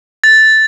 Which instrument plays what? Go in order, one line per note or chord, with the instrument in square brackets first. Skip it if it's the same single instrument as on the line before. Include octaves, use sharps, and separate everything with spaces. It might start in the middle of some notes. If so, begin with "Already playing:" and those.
[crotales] A6